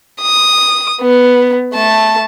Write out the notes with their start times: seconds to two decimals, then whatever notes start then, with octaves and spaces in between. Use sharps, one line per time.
0.22 D#6
1.01 B3
1.74 A3 A5